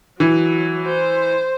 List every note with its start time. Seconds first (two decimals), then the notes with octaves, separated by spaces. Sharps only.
0.20 E3 F#3
0.87 C5